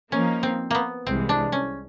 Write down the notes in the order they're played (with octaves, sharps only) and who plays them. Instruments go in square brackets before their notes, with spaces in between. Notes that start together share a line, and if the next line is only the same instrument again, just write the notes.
[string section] F3 A#3 D#4 [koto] C#4
[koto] C4
A#3 B3
[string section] C2 C3 E3 G#3 [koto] C4
[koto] D4
C#4